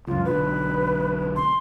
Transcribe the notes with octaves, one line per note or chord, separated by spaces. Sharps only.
C#2 F#2 F4
B1 D3 B4
C6